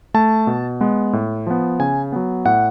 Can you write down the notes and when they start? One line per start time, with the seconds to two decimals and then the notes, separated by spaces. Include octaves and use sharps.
0.14 A3 A5
0.47 B2
0.81 G#3 B3
1.13 A2
1.47 F3 B3
1.79 C#3 G#5
2.12 F#3 B3
2.45 A2 F#5